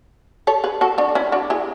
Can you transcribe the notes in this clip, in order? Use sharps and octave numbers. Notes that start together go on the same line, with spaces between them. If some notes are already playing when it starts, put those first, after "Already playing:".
A4 C#5
G#4 B4
F#4 A4
D4 F#4
C#4 E4
D4 F#4
E4 G#4